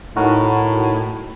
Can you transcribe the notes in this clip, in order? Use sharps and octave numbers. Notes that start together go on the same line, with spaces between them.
A2 D#4 F#4 A#4